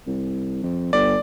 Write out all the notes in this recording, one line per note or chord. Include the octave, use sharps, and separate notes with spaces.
C2
F2
G1 D5